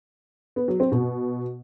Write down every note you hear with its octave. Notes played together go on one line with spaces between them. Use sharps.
B3
F#3
C4
B2